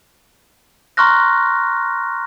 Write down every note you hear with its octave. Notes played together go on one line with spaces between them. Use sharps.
A#5 C6 C#6 F6 F#6 A#6